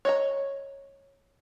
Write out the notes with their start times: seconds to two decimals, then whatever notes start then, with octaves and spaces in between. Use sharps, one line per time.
0.05 C#5 D#5 A#5